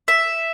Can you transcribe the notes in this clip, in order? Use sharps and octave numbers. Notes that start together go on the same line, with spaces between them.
E5